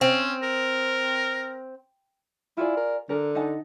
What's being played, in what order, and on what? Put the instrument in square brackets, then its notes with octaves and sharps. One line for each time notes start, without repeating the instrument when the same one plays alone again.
[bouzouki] C4 [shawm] C#4
[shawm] A#4
[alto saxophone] E4 [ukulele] F4 G#4 D5
[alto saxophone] A#4
[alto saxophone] D3 [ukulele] A#4
[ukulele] D#4 F#5 A5